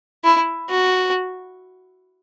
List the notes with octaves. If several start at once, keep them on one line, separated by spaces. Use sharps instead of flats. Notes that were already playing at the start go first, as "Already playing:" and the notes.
E4
F#4